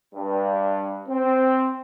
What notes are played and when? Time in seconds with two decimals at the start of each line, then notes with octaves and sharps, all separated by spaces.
0.15 G2
1.09 C4